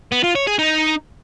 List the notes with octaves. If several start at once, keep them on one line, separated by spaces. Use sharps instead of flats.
B3
F4
C#5
G#4
D#4